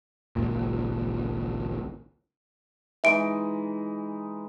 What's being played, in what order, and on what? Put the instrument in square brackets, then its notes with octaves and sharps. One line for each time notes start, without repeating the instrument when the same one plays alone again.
[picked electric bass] G#1 C#2 A#2
[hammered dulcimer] E3 G#3 D#4 [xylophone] E5 D7